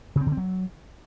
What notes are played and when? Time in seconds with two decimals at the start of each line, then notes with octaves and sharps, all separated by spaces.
0.16 C#3
0.21 C4
0.26 D3
0.32 C4
0.37 F#3